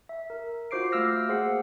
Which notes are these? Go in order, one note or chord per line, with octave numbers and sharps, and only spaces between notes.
E5
A#4
F4 F#4 C5 D6 C7 D7
A3 F5 D6 E6 F6 A#6
A#3 G#4 C5 F#5 C7